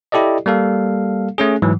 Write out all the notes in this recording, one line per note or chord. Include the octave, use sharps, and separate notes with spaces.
E4 G4 A4 D5 D#5
G3 A#3 A4 F5
A3 C#4 G#4
G#2 E3 F#3